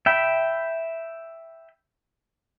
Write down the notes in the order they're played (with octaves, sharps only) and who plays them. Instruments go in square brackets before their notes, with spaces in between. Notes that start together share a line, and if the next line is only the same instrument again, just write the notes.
[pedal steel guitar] E5 G5 B5